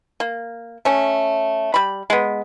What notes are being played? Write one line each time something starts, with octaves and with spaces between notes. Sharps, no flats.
A#3
A3 C#4
G3 B5
G#3 B3